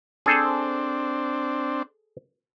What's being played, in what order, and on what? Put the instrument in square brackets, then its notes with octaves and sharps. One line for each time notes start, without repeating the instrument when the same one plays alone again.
[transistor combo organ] C4 D4 [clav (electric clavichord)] G#4 A4 C5